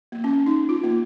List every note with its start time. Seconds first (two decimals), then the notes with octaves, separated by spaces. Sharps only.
0.12 A#3
0.24 C#4
0.46 D#4
0.69 F4
0.84 A#3